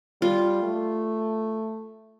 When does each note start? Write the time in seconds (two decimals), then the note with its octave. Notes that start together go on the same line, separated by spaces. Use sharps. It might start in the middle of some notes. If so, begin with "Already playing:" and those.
0.21 G3 F4
0.63 A3